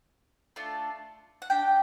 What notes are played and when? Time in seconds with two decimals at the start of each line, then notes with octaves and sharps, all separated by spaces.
0.56 A3 D4 F4
1.42 F#5
1.50 D4 G4 G5